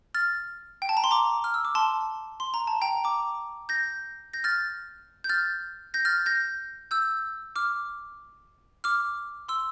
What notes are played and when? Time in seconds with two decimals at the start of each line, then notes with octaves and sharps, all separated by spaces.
0.14 F6 A6
0.82 G5
0.89 A5
0.97 A#5
1.04 C6
1.11 A#5 D6
1.44 F6
1.54 E6
1.65 D6
1.75 A5 C6
2.40 C6
2.54 A#5
2.67 A5
2.82 G5 A#5
3.04 A#5 D6
3.69 G6 A#6
4.33 G6 A#6
4.44 F6 A6
5.24 G6
5.29 F6 A6
5.94 G6 A#6
6.05 F6 A6
6.26 G6 A#6
6.91 E6 G6
7.56 D6 F6
8.84 D6 F6
9.49 C6 E6